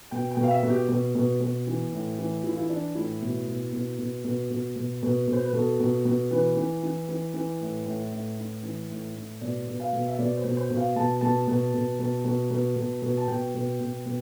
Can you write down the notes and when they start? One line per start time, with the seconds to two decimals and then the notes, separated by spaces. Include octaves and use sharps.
0.11 B2 G5
0.31 G5
0.37 B2
0.43 F5
0.51 E5
0.63 B2
0.70 G4
0.88 B2
1.15 B2
1.40 B2
1.67 E3
1.93 A2
2.19 E3
2.43 E3 E4
2.52 F4
2.58 E4
2.69 E3 D4
2.95 A2 E4
3.22 B2
3.48 B2
3.73 B2
3.99 B2
4.24 B2
4.50 B2
4.76 B2
5.03 B2
5.28 B2
5.33 C5
5.43 B4
5.53 B2 A4
5.80 B2
6.05 B2
6.31 E3 B4
6.57 E3
6.83 E3
7.09 E3
7.34 E3
7.61 A2
7.86 A2
8.12 A2
8.38 A2
8.63 E3
8.90 A2
9.16 A2
9.41 B2 D5
9.67 B2
9.80 F5
9.93 B2
10.08 E5
10.19 B2 D5
10.37 C5
10.44 B2
10.57 C5
10.70 B2
10.76 F5
10.96 B2 A5
11.21 B2 A5
11.47 B2
11.74 B2
11.99 B2
12.24 B2
12.51 B2
12.76 B2
13.02 B2
13.17 A5
13.28 B2 G5
13.55 B2
13.80 B2
14.06 B2